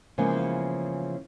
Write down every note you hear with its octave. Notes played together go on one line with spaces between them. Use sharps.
C#3 E3 F3 G#3 A#3 B3